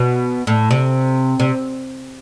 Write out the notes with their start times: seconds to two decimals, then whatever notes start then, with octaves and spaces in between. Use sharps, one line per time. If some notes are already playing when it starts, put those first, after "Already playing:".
Already playing: B2
0.47 A2
0.71 C3
1.40 C3